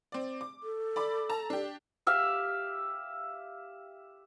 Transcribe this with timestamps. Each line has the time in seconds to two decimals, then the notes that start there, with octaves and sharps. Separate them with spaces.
0.12 C4 D5
0.41 D6
0.63 A4
0.96 D5 B5 D6
1.29 A5 A#5
1.50 D4 G4
2.07 G4 E5 F5